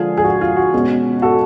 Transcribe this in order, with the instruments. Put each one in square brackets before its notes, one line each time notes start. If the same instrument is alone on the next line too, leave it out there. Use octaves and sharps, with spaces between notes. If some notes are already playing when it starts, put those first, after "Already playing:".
Already playing: [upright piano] D3 F3 G#3 D4 F4 G#4
G#4
F#4
F4
F#4
B2 G#3 C#4
F#4 A4